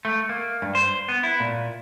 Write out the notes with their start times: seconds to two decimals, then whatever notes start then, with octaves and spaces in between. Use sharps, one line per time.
0.05 A3
0.29 A#3
0.62 G2
0.75 C5
1.08 B3
1.23 E4
1.40 A#2